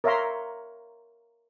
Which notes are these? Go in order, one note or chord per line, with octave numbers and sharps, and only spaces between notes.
A#4 C#5 E5 F5 A#5 C6